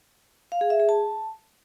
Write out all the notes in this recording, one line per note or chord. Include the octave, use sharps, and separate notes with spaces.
F5
G#4
E5
G#4
A5